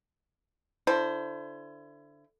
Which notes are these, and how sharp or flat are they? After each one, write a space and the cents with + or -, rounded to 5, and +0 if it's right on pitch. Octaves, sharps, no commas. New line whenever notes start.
D3 +0 E4 +30 C5 +0